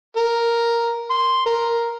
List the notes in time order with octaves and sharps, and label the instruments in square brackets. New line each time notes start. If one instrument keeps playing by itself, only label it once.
[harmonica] A#4
C6
A#4